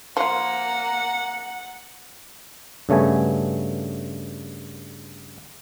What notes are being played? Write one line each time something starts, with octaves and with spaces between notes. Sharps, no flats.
F3 A#3 F4 F#5
G2 C#3 A3 B3 G#5